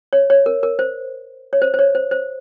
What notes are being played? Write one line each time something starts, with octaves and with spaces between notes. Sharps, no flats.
C#5
C#5
A#4
A#4
C5
C#5
C5
C5
C#5
C5
C5